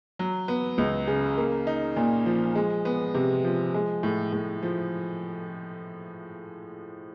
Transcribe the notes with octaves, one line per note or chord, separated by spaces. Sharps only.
F#3
B3
C#2
C#3
A#3
D#4
A#2
F3
G#3
B3
C3
F3
G#3
A2
A2
F3